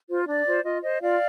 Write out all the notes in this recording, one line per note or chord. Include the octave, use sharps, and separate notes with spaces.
F4 C5
D4 D5
F4 C5
F4 D#5
C5 D#5
F4 D5 F5